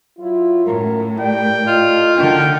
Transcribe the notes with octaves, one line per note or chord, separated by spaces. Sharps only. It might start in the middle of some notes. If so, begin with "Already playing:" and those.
F#3 E4 F4
F#2 A2 A#4
G4 A#4 D5 G5
A3 E4 F4 D#5
D3 E4 F#4 A#4 G5